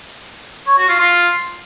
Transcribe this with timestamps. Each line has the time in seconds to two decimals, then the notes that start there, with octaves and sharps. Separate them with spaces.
0.67 C#5
0.78 F#4
0.89 F4
1.00 F4